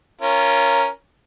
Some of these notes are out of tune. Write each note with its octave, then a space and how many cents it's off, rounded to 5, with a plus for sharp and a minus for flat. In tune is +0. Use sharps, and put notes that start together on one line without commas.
C#4 +0 F4 -25 A#4 +0